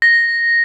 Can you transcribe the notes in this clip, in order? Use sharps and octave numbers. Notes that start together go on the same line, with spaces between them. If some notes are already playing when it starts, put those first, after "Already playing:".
A#6